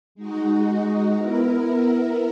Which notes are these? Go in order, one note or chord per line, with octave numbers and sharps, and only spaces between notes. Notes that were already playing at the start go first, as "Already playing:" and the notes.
G#3 D#4 F#4
B3 E4 A#4